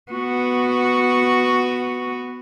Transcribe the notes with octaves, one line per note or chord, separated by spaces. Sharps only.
B3 F#4